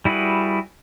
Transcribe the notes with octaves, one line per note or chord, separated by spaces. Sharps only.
G3 E4 F#4 G#4 B4